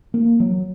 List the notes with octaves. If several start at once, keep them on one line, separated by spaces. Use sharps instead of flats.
A#3
F#3